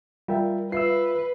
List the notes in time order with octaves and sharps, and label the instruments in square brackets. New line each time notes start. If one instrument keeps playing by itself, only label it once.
[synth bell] G3 [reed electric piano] F4 A#4 [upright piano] E5 G5
[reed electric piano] F4 E5 E6 [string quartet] B4 [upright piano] C7